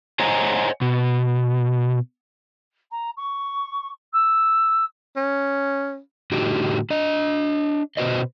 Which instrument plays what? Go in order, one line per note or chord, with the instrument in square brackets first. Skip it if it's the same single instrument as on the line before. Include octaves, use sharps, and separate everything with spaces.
[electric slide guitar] C5 C#5 D#5 F#5 G#5 A#5
B2
[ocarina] A#5
C#6
E6
[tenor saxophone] C#4
[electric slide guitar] A2 D3 D#4 F#4 G4
D4 D#5
B2 E3 F#4 B4 C5 D#5